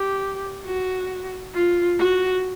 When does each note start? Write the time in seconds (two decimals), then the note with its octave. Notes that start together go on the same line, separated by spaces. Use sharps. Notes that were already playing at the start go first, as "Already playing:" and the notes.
Already playing: G4
0.65 F#4
1.54 F4
1.99 F#4